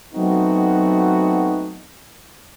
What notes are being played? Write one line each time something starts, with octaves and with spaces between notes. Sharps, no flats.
F#3 A3 B3 C4 D#4 F#4